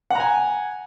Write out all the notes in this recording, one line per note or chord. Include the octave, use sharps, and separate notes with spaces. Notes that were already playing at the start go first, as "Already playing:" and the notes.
F#5 G#5 A#5